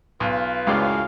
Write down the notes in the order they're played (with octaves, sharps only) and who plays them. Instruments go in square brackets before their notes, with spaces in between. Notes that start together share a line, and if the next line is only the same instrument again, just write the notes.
[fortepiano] B1 [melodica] F4 B4
[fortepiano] C#2 G#3 D5 [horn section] F#2 A2 F5